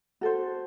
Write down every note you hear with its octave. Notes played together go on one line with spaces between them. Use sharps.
F#4 A4 C5